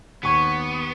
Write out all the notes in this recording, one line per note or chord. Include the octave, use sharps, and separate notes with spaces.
D#2 B3 C#6 G#6